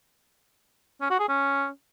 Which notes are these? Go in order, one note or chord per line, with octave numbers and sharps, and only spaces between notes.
C#4
F#4
G#4
C#4